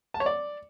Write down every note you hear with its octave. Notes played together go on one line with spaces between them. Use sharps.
A5
C#5
D5